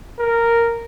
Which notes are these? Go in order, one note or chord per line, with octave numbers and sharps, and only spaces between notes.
A#4